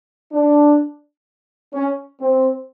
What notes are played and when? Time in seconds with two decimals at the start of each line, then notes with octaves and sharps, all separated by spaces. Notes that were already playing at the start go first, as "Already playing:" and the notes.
0.33 D4
1.74 C#4
2.20 C4